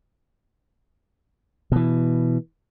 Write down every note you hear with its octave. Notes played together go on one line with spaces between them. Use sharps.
B2 E3